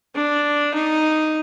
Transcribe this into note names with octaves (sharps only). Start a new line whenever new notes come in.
D4
D#4